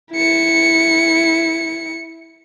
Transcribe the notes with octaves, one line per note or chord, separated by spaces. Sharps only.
E4 C#7